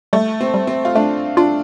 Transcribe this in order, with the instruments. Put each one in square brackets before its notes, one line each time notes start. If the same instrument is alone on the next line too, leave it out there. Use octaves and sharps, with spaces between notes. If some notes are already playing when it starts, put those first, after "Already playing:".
[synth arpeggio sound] G3 [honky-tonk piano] A3
[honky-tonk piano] C4
[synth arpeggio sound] G3
[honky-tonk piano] C4
F4
[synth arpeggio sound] A3 [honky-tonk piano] D4
[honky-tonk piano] D4 [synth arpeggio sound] F4